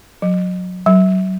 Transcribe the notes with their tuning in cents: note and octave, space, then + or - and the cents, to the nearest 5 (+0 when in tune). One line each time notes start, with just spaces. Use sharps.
F#3 -25
F#3 +25